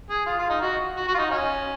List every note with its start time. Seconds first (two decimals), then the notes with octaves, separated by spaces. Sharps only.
0.10 G#4
0.26 F4
0.39 F4
0.50 D#4
0.61 F#4
0.96 F#4
1.08 F#4
1.14 F4
1.18 D#4
1.31 C#4